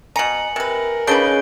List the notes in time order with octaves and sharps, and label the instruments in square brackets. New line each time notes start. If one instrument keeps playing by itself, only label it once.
[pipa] B2 A#5 [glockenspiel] G#5 C#7 F#7
[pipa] C3 B4 [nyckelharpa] A#4
[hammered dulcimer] C#3 [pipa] D4 D#4 B4 [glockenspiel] G6 D7 G7